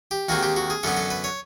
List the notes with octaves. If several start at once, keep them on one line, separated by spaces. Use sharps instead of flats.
G4
D#2 D#3 G#3 C4 F#4
G4
F#4
G#4
F#2 D3 F#3 B3 A4
A4
B4
C#5